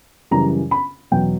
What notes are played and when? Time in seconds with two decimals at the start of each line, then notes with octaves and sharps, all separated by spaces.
0.31 F#2 C#3 E3 G3 A#5
0.71 B5
1.11 E2 B2 F#3 G5